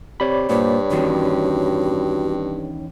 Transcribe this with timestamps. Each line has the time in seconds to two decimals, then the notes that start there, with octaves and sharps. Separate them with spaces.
0.20 C3 C#5 D5 B5
0.49 G2 A#2 C5
0.91 E2 D#3 C#4 F#4